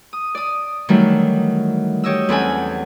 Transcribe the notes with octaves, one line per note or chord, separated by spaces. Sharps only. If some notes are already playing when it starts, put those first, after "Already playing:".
D#6
D5 D#6
D#3 E3 F#3 G3 A3
G4 C#5 D#5 E6
E2 C4 C#4 A4 F#5 G#5